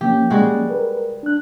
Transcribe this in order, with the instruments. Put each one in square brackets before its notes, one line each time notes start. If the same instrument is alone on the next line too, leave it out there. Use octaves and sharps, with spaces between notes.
[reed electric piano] F3 A#3 C#4 [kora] G4
[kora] G3 G#3 F#4
[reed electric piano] A#4 B4
D4 F#6